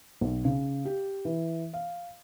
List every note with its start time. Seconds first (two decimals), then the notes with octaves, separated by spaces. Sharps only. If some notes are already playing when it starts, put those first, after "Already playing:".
0.21 B1
0.45 C#3
0.85 G4
1.25 E3
1.73 F5